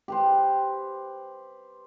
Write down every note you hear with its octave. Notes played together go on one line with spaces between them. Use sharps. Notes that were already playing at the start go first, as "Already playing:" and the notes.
G4 B4 C5